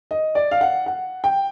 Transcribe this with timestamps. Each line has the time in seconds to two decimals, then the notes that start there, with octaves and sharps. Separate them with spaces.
0.11 D#5
0.35 D5
0.51 F5
0.61 F#5
0.86 F#5
1.24 G5